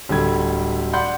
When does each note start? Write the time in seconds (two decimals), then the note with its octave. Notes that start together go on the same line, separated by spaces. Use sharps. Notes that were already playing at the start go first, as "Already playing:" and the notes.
0.09 D1 D3 G3 G#6
0.93 D5 F#5 B5 C6 G6